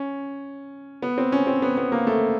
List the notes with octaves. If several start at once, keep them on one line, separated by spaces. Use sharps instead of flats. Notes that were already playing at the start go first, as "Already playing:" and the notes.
Already playing: C#4
B3
C4
C#4
C4
B3
B3
A#3
A3